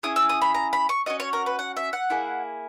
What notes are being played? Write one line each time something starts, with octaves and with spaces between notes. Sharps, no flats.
C#4 E4 G#4 D#6
E6
D#6
B5
A#5
B5
C#6
C#4 F#4 D#5
C#5
A#4
B4
F#5
E5
F#5
A#3 E4 G#4